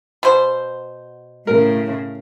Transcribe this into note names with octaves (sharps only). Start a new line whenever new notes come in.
B2 C5
A2 C#3 A#4